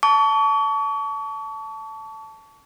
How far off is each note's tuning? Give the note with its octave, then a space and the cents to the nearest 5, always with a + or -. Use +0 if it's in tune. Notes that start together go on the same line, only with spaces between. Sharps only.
A5 +0 C#6 +40